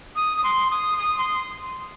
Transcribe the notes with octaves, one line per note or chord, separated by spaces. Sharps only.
D#6
D#6
C6
D#6
D#6
C6